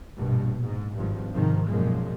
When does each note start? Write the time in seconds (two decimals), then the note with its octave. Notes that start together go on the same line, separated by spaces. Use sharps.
0.17 A#1 G2 B2
0.63 G#2
0.96 G#1 G2 F3
1.33 G#2 C3 D#3 F3
1.68 B1 F#2 A#2 F3 G#3